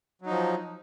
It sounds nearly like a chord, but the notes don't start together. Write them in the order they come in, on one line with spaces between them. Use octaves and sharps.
F#3 D#4 F3